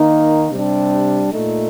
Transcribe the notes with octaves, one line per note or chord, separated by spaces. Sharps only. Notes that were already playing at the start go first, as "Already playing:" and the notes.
Already playing: D#3 A#3 D#4 A#4
C3 G3 D4
A#2 A3 D#4